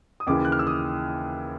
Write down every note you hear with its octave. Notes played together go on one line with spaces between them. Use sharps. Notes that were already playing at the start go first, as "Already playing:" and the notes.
D#6
D#2 C#3 E3 D6
F#6
F6
E6
D#6